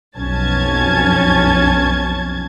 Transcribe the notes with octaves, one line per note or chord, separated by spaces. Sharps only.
B1 F2 C#4 A5 G#6